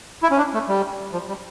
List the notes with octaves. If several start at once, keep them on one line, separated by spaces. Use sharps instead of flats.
E4
C#4
D4
A3
G3
F3
G3